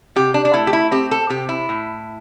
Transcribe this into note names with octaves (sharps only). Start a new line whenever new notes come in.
C3 G4
D4
D4
A3 E4
G4
E4
C4 G4
A4
C3 G4
E4
A2